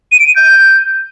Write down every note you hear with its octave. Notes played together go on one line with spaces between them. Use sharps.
D#7
D7
D#7
G6